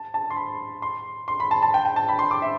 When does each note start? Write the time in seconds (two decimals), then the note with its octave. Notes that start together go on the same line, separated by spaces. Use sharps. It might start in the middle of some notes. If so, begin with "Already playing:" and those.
Already playing: A5
0.14 A5
0.30 C6
0.36 B5
0.82 C6
1.28 C6
1.40 B5
1.51 A5
1.62 A5
1.74 G5
1.85 G5
1.96 A5
2.09 B5
2.19 C6
2.31 D6
2.42 E5